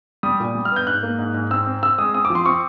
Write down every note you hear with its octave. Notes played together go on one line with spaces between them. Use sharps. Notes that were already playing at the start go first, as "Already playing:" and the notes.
G3 D#6
A#2
G3
F6
B3 G6
G#2 F#6
A#3
G#2
G#2
C4 E6
C4
C4 E6
G#3 D#6
C4 D#6
D6
F3
C6
C4 C#6